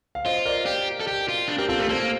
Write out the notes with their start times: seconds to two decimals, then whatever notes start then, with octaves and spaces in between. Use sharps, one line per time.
0.15 F5
0.25 F4 C5 D#5
0.45 A#4 D5
0.66 G4
1.00 A4
1.07 G4
1.28 F4
1.48 D4
1.58 C4 G4 A#4
1.69 C4 F4 A4
1.79 A3 G4 A#4
1.89 A#3 A4 C5